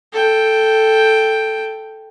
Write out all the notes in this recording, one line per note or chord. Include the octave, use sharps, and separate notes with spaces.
A4 G5